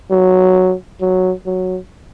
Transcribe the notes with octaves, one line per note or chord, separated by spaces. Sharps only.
F#3
F#3
F#3